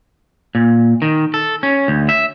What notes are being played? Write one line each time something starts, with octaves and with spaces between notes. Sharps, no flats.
A#2
D#3
A4
C#4
D2
E5